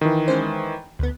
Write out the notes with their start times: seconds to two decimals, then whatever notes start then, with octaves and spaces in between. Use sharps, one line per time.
0.01 D#3 E3
0.28 G#3 C#4 C5
0.99 D2 B3